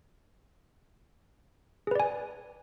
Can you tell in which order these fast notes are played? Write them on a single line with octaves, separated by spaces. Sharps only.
G#4 B4 D5 G#5